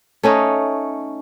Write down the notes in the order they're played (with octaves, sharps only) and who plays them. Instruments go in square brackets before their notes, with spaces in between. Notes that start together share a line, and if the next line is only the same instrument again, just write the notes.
[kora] A3 C#4 D#4